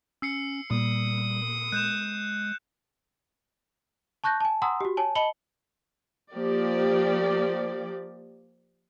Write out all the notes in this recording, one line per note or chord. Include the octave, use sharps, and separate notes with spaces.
C#4 E6 C7 C#7
A#2 G3 D#6
G#3 F#6 G6 E7
A5 C#6 F#6 G6 A#6
G#5 A5
F#5 G#5 A#5 C6 D#6 E6
F#4 G4
C#5 G#5 A5
D#5 A5 B5 C#7 F#7 G7
F3 A#3 G4 D5